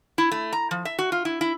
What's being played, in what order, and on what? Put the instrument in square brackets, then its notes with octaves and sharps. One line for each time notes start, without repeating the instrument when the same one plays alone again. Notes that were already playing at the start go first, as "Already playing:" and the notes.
[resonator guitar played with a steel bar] E4
A3
A#5
F3
E5
F#4
F4
E4
E4